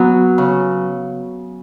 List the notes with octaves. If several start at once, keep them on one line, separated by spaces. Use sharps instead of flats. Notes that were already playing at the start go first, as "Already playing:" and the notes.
Already playing: F#3 B3
C#3